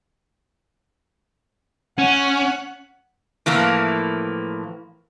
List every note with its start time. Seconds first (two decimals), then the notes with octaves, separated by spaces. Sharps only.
1.98 C#4 F#5
3.46 A2 E3 F3 A#3